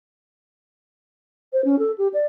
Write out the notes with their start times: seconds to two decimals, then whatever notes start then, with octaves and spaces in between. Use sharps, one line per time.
1.53 C5
1.65 C#4
1.79 A4
1.98 G4
2.14 D5